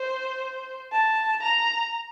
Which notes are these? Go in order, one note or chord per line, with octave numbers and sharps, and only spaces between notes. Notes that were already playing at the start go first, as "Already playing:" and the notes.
Already playing: C5
A5
A#5